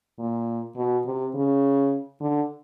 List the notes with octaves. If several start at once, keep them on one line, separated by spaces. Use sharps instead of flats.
A#2
B2
C3
C#3
D3